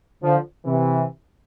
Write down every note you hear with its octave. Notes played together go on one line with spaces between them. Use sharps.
D3 F3
C3 E3